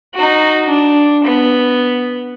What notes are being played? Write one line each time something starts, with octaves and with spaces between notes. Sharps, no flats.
D#4 F#4
D4
B3